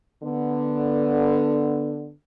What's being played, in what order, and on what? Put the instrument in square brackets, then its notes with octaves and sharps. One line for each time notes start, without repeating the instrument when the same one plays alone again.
[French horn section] D3 B3